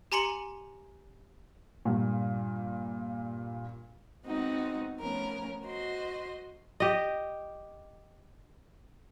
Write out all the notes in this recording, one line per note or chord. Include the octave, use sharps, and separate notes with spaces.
G4 G#5 A#5 C6 C#7 F#7
G2 A#2
G#3 B3 C4 D#4 F#4 F#5
F3 A3 B3 C#4 A#4
F#4 C5 D#5 C6
G4 D#5